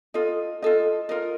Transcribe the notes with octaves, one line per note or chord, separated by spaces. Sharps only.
F4 A4 D#5
F4 A4 D#5
F4 A#4 D#5